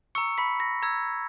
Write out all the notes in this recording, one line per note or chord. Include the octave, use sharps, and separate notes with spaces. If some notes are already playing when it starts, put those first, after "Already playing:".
A#5 C#6 E6 C#7
B5 B6
A#6
A#5 E6 G#6